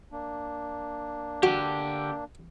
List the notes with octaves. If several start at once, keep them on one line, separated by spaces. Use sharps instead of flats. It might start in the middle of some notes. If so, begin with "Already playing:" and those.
A#3 D4
D3 F#4 G4